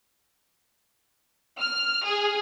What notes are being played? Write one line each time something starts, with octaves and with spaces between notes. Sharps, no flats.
F6
G#4